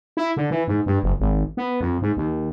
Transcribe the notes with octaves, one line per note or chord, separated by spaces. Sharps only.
E4
D3
E3
G#2
G2
F#1
G#1
B3
F2
G#2
D#2